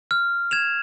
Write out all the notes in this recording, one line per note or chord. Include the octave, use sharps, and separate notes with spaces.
F6
G#6 E7 F7